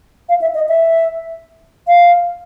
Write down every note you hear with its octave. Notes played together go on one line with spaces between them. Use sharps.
F5
E5
D#5
E5
F5